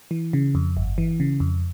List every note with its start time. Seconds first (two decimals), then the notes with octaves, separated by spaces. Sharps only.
0.11 E3
0.33 C#3
0.55 F2
0.77 G1
0.98 E3
1.20 C#3
1.40 F2